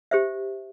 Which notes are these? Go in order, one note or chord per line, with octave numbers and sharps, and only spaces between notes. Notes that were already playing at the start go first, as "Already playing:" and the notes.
G4 C5 E5